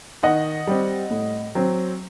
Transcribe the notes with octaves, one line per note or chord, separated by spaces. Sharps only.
D#3 D#5 F#5
G3 C4
A2
F#3 C4